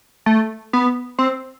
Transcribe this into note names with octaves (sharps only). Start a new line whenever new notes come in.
A3
B3
C4